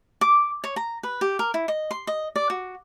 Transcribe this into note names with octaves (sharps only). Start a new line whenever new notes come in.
D6
C#5
A#5
B4
G4
A#4
E4
D#5
C6
D#5
D5
F#4